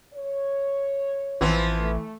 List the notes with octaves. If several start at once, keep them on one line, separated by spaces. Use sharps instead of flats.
C#5
A1 E3 F3 B3 C4
A3